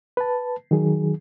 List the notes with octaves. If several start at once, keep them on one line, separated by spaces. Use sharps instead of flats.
B4 A5
D#3 F#3 G#4